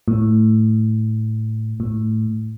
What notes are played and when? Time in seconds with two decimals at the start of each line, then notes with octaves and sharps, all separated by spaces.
0.08 A2
1.80 A2